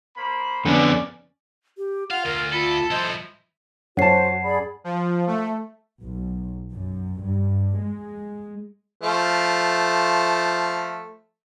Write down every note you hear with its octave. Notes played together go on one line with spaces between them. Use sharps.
A#3 C5 B5
F2 D3 B3 C#4 D5
G4
F4 F5 F#5
D2 A#4
F4 A4 B5
F3 E4 C5 D#5
F#2 C#4 F#4 C5 C#5 F#5 A5 C7
G#4 D5 B5
F3
A3
B1
F#2
G2
G#3
F3 A3